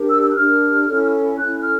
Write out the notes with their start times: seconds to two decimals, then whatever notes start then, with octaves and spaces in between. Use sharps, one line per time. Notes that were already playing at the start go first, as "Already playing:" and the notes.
Already playing: D4 G4 A#4
0.10 E6
0.22 E6
0.31 F#6
0.35 D4 G4 A#4 F6
0.87 C#4 E4 A4 C#5
1.37 C#4 E4 A4 C#5 F#6
1.63 F6